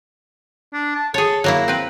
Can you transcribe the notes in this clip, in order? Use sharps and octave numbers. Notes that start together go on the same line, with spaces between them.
D4
A5
G#4 A4 C#5
F#3 A#3 E4 A#5
C4 B4